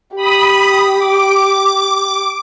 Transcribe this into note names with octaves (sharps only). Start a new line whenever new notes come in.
G4 B5 D#6
D6